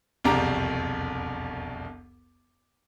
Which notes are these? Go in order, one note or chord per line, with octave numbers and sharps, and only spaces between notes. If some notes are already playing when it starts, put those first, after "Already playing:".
E1 C2 F2 G4 A#5 D6